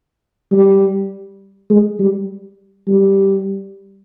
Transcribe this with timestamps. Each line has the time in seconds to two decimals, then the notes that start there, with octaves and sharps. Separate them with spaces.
0.52 G3
1.70 G#3
1.99 G3
2.88 G3